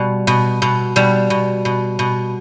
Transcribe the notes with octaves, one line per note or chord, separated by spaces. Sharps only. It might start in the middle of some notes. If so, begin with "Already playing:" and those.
Already playing: B2 G3
B2
B2
B2 G3
B2
B2
B2